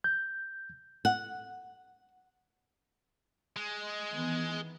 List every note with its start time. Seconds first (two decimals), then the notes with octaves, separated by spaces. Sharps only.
0.04 G6
1.05 F#5
3.56 G#3
4.12 D#3 E3 B3